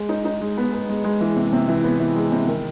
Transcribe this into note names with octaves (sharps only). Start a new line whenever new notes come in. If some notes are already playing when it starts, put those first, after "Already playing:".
Already playing: G#3
D#4
D#4
G#3
B3
B3
G#3
G#3
E3
C3
C3
E3
B3
E3
G#3
C3
D#3